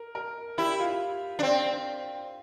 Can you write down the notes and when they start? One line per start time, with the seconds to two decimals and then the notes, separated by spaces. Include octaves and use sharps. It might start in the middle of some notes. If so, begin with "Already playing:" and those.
Already playing: A#4
0.15 A#4
0.58 E4 G4
0.79 F4
1.39 D4
1.43 C4